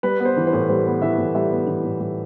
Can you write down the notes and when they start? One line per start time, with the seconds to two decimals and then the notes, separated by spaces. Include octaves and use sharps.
0.03 G3 B4
0.20 B3
0.25 C5
0.37 E3
0.47 C5
0.53 A2
0.69 G3 C5
0.86 B3
1.02 E3 E5
1.18 A2
1.35 G3 E5
1.51 B3
1.67 E3
1.85 A2
2.00 G3